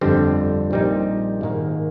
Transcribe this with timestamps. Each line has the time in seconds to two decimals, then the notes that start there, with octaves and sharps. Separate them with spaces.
0.01 G1 F2 D3 G3 C4
0.71 A#1 A#2 G3 C4 D#4
1.41 G#1 G#2 D#3 A#3